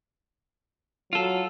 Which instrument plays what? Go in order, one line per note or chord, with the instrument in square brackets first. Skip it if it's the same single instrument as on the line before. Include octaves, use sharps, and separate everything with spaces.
[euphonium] F#3 [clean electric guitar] F4 A4